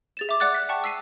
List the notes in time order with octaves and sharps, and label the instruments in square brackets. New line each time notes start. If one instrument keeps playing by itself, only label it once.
[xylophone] G#4 A6 E7
E5 D6
D5 F#5 D6 F#6 A6
F#6 B6
F#5 G5 A5 C#6
E6 B6 C7 D#7